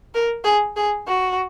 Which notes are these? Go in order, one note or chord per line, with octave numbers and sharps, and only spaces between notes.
A#4
G#4
G#4
F#4